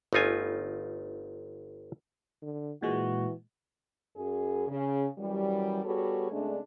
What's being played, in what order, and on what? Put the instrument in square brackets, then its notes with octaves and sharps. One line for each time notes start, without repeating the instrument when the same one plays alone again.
[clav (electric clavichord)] G1 A3 D#4 F4 G#5
[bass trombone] D3
[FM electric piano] A#2 G#3 [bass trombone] E3 [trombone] F#4
[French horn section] F#2 G#4
C#3
F#2 E3 F#3 G3
G3 B3 F#4 G#4 A4 C#5
C#3 G#3 A3 C4 D4